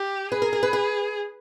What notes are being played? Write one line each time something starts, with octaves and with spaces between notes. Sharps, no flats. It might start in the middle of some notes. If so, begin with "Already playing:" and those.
Already playing: G4
G#4 B4
A#4
A#4
B4
B4